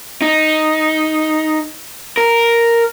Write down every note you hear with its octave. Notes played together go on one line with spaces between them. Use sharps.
D#4
A#4